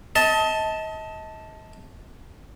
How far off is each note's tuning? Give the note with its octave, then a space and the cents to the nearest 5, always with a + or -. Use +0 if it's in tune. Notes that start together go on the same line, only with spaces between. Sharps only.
D#5 +35 A5 +0